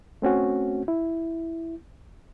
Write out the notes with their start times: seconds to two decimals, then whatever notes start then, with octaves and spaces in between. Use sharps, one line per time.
0.22 A3 C4 C#4 F#4
0.88 E4